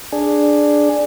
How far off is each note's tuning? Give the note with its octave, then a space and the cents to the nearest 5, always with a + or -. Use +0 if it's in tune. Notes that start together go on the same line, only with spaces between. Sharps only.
D4 +5 G#4 +0